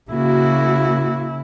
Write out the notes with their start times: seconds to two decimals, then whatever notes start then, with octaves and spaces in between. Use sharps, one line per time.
0.10 C#3 A#3 E4 F#4